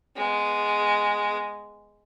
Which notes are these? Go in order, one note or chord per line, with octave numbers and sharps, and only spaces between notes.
G#3 B3